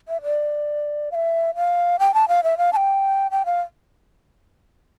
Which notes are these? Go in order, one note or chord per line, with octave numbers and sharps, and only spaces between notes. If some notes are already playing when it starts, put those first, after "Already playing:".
E5
D5
F5
E5
F5
G5
A5
F5
E5
F5
A5
G5
G5
F5